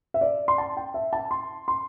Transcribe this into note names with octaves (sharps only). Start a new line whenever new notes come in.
E5
D5
C6
A5
G5
E5
A5
C6
C6